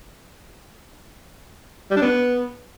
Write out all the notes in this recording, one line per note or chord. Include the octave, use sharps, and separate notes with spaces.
G3
D4
B3